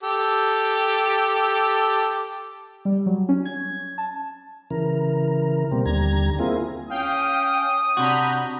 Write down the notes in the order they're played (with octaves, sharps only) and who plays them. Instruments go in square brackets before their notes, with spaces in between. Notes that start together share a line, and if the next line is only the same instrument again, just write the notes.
[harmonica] G4 A4
[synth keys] G3
F#3
C#4
G#6
A5
[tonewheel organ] C#3 E3 A#4
B2 G3 A#3 C4
D#2 D3 G3 A#5 G#6
A#3 C4 E4 F4 G#4
[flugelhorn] C#4 [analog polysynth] F5 G5 [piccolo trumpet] D#6
[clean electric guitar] C3 F#4 [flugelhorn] D4 [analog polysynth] A#5 B5 G6